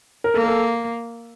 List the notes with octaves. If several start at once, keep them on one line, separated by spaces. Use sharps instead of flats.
A#4
A#3 A4
A#4
A4